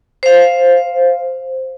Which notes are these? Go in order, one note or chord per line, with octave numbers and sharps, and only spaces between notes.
C5 F5